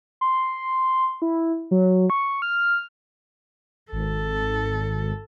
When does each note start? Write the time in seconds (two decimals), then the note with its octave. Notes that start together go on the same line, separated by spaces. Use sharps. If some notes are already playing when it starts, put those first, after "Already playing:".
0.21 C6
1.22 E4
1.71 F#3
2.10 C#6
2.42 F6
3.92 G#1 A4